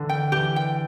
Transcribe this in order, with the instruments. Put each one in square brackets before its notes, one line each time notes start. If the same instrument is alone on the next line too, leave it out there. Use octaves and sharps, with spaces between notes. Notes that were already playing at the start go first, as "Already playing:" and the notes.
Already playing: [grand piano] D3 E3
[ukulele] G5
[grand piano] E3 [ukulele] G4
[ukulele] G5